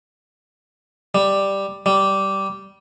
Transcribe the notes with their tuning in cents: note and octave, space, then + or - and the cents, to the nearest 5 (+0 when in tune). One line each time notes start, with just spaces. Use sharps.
G3 +5
G3 -10